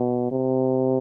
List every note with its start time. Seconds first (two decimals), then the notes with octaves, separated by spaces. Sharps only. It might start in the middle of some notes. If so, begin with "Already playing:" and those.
Already playing: B2
0.31 C3